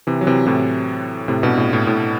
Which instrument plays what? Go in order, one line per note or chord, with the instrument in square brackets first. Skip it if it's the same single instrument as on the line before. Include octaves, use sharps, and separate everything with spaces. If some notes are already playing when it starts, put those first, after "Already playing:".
[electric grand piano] C3 E3
F#3
C3 E3
A2 C3
A2 C3
G2 B2
A2
A2
A2